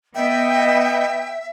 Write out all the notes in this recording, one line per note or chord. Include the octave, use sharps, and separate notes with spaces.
B3 D#5 E5 G5